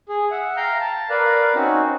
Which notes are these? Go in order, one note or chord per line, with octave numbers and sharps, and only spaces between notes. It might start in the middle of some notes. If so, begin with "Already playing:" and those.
G#4
E5 F#5
F5 G5 A#5 F6 G6
A5
A#4 B4 D5 F5
C4 C#4 D#4 F#4